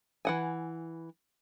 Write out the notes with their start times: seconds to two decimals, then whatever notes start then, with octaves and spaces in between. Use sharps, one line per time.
0.25 E3 F#5 G#5